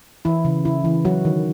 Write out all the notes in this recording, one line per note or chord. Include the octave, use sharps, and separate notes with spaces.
E3 E4
C#3
C#3 E4
E3
F#3 F#4
D#3